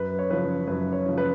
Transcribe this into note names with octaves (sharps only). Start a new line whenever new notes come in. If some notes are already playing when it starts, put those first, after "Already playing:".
Already playing: F#2 B4
C#5
C#3 F3 B4
F#2 B4
C#5
C#3 F3
B4